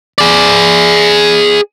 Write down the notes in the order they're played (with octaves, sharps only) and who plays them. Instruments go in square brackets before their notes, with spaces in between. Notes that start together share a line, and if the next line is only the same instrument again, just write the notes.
[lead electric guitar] G#4 D5